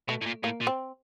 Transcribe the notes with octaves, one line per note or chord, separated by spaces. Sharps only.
B2 A3
A2
A#2
A2 A#3
A#2
C4